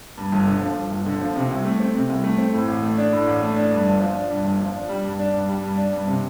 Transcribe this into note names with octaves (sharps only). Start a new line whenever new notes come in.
G2
G1
D3
F3
G2
G1
D3
F3
C3
C2
A3
C4
C3
C2
A3
C4
A2
A1
A3
D4
A2
A1
A3
D4
G2
G1
F3
D4
G2
G1
F3
D4
G3
G2
D4
G2
G3
G2
D4
G2
C3